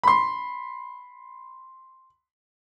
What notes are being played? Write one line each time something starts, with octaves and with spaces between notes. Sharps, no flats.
B5 C6